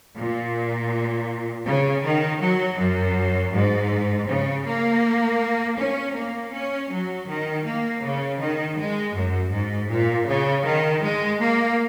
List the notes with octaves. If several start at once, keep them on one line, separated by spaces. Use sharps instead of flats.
A#2
C#3
D#3
F#3
F#2
G#2
C#3
A#3
C#4
A#3
C#4
F#3
D#3
A#3
C#3
D#3
G#3
F#2
G#2
A#2
C#3
D#3
G#3
A#3